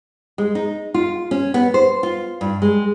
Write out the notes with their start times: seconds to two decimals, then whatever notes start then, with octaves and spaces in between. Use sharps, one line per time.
0.38 G#3
0.55 D#4
0.94 F4
1.31 C#4
1.54 B3
1.74 C5
2.03 F4
2.41 G2
2.62 G#3